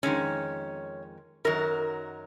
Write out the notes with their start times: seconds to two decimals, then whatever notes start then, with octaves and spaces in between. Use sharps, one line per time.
0.03 F2 D#3 G#3 C#4
1.45 F#2 D#3 F#3 A#4